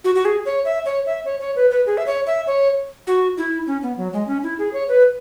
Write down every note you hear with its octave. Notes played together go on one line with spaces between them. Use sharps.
F#4
F#4
G#4
C#5
E5
C#5
E5
C#5
C#5
B4
B4
G#4
E5
C#5
E5
C#5
F#4
E4
C#4
B3
F#3
G#3
C#4
E4
G#4
C#5
B4